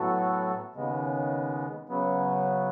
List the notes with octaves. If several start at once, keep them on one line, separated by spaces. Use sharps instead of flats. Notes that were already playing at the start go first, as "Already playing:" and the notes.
Already playing: A2 F#3 B3 F#4 A4
D#2 C#3 G#3 B3
C#3 F#3 B3